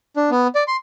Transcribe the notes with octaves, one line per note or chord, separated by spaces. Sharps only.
D4
B3
D5
C6